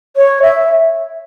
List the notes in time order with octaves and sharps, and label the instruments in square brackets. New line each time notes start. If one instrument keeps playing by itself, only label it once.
[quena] C#5
E5